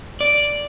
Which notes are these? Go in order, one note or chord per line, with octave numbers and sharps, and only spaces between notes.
D5